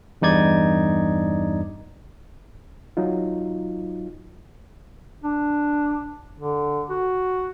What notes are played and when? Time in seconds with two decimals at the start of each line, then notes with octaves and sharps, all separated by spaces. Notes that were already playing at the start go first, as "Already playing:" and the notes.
0.22 E2 G2 D#4 D5 G#6
2.97 F#3 D#4 F4
5.24 D4
6.39 D3
6.90 F#4